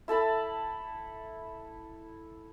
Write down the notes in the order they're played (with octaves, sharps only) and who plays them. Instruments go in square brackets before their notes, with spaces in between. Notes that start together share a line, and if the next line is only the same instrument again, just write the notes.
[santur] E4 A4 A5 B5